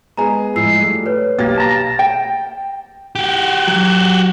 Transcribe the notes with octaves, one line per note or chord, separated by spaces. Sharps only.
G#3 B3 G#4 A#5
A2 F3 G#3 E6 C7
G3 A3
B4 C#5
B1 A#3 G4 A6
A5 A#5
G5
F#4 G4
F#3